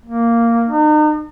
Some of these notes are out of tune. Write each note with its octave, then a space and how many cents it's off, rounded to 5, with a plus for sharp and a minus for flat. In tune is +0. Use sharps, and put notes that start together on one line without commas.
A#3 -5
D#4 -40